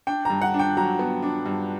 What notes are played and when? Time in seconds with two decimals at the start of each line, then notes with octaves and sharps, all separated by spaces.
0.07 D4 G5
0.25 G2 A#5
0.41 F#5
0.54 D4
0.59 G5
0.77 F#3 A#5
0.99 B3
1.23 D4
1.46 G2